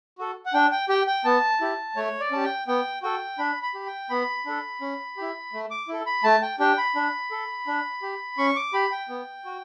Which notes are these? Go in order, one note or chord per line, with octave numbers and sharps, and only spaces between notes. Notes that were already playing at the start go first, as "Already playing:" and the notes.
F#4 A4
F#5
D4 G5
G5
G4 G5
G5
B3 A5
E4 G4
A3 C#5
D5
C#4 G4 A5
G5
B3 G5
F#4 A4 G5
D4 B5
B5
G4
G5
B3 B5
D4 A4
C#4
E4 G4
A3
D6
E4 A4
B5
A3 A5
G5
D4 G4 G5
B5
D4
A4
D4
G4
C#4 C#6
D6
G4 B5
G5
B3
F#4